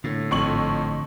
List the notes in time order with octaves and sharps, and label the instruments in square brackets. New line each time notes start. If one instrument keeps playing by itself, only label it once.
[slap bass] A2 [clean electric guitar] D3
[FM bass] G#1 [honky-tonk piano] F2 C#6 F#7